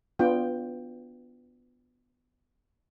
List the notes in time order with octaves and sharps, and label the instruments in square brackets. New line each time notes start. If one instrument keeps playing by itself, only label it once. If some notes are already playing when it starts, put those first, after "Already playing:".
[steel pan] B3 D4 F4 G5